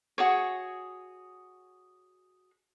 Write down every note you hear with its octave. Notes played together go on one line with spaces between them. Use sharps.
F#4 G#4 C#5